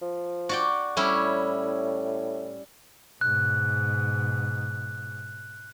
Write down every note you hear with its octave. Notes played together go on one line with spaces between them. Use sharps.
F3
F#4 D5 G5
A2 G3 C#4 E4
G#2 B2 F#6